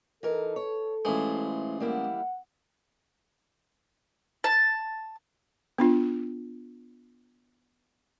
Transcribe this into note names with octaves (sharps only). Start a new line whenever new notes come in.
E3 D#4 A4 A#4
C#5
A1 G#3 E4 F4 C5
G3 A#3 E4 F#5
A5
B3 D4 F4